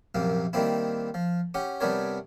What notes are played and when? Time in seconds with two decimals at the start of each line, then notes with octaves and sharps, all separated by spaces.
0.15 A#1 F#2 C3 A#3
0.53 D#3 G3 A#3 C4 E4
1.14 F3
1.54 C#4 G4 F#5
1.80 C3 G3 B3 D4 A#4 C#5